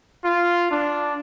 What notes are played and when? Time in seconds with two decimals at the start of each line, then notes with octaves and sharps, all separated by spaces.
0.24 F4
0.71 D4